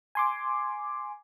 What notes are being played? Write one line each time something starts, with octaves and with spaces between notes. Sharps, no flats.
G#5 C6 D6